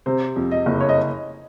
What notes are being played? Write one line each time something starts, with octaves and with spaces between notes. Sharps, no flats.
C3 C5
F2
D#5
F#1
C#5
D#5